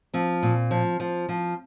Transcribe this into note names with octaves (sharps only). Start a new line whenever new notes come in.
F3 C4
A#2
F3
F3
F3